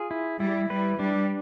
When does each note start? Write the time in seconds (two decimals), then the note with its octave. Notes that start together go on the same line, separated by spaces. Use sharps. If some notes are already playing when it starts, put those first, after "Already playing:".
Already playing: F4 G#4
0.11 E4
0.40 G3 E4
0.70 G3 B4
0.99 G3 D4